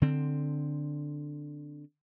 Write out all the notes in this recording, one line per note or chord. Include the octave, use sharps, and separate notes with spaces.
D3 C4